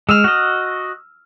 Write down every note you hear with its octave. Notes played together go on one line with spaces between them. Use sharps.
G#3 E6 F6
F#4 D#5